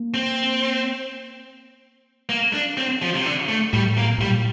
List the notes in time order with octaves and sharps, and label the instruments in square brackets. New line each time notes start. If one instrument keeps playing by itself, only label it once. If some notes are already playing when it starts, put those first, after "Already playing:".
Already playing: [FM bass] A#3
[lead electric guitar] C4
A#3
D4
C4
F3
C3
D3
A3
[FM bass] A2 [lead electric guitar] G3
[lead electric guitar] A#3
[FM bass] A#2
[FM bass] A2 [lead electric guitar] G3
[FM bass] A#2